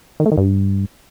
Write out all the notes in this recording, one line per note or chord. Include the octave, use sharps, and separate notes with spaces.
D#3
A3
D#3
G2